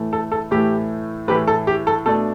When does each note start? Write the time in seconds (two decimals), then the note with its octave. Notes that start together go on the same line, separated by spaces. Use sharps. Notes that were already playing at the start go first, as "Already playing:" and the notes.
Already playing: A2 E3 A3
0.13 A4
0.32 A4
0.51 A2 E3 A3 G4
1.28 A2 E3 A3 G4 B4
1.48 A4
1.67 G4
1.87 A4
2.06 B2 A3 D4 A4